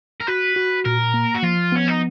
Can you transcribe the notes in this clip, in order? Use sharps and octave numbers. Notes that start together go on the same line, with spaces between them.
A#4
F#4 B4
F#4
A#2 A#4
A#3
F#4
F3 F4
B3 C#4
D#4